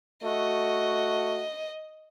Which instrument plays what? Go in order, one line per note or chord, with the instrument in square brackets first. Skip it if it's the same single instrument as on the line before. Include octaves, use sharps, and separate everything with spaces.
[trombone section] A3 F#4 [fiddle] D#5